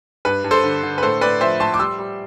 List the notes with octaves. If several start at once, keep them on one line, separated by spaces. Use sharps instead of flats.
G2 B4
G2
A4 C5
D3
D3
B4
A2 A4 C5
A2 B4 D5
F3 C5 E5
A2 A5 C6
D6
G3 C6 E6
G3